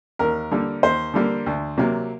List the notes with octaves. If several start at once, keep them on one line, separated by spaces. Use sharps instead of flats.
D#2 A#4
D3 G3 A#3
D#2 C5
D3 G3 A#3
D2
C3 F#3 A#3